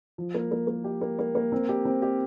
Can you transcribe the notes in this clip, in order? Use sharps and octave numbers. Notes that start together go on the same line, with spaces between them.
F3
A#3
A#3
A#3
G4
A#3
A#3
A#3
C4
G4
C4
G4